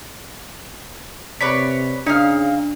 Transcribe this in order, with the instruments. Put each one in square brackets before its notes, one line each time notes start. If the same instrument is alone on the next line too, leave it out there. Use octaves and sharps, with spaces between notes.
[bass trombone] C3 [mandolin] B4 C#5 D5 [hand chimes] B6
[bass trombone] C#3 [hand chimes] D4 [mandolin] D#4 F5 F6